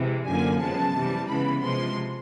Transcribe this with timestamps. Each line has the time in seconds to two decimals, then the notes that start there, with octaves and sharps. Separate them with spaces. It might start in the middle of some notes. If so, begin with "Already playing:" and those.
Already playing: C3 E3 G#3
0.26 F#2 D3 F3 A#3 G#5
0.60 F#2 C#3 F3 G#3 B3 A5
0.95 C3 E3 G3
1.29 C#3 E3 G#3 B3 B5
1.64 C3 F3 G#3 C6